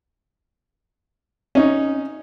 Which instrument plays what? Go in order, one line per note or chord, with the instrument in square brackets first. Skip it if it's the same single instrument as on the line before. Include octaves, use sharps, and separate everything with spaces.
[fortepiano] C#4 D#4